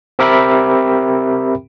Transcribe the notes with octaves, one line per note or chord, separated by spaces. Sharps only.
C4 G4 A#4 E5 G5 B5